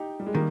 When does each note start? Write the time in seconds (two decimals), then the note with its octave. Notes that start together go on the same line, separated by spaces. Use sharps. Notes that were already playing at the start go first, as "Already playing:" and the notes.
Already playing: D#4 G4
0.20 G3
0.27 G#3
0.34 D#3 G3 A#3